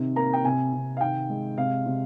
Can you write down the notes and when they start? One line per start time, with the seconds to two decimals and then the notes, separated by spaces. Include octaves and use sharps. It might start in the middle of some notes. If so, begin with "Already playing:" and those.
Already playing: C3 D#3
0.16 A#3 A#5
0.33 G5
0.45 C3 G#5
0.73 C3
0.97 F5
1.01 D#3 G5
1.29 G#3
1.57 C3 F5
1.86 C3